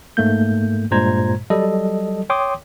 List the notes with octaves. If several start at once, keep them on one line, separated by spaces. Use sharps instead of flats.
G#2 A3 A#3 G6
G2 A#2 G#3 C5 A#5 G#6
F#3 G3 A4 D#5
C#5 G5 C6 D6 D#6